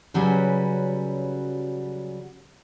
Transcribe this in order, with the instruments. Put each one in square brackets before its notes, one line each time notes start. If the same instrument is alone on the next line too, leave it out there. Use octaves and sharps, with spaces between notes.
[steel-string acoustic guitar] C#3 F#3 G3 C#4 F#4 B4